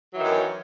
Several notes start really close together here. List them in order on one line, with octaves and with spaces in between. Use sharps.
F#3 E3 D#3 F#2